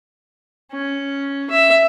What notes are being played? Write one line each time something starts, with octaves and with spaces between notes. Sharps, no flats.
C#4
E5